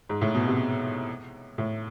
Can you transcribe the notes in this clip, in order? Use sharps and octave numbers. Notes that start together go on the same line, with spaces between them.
G#2
A2
B2
C3
A2